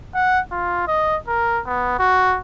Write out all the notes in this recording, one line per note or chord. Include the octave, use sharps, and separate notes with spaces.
F#5
F4
D#5
A#4
B3
F#4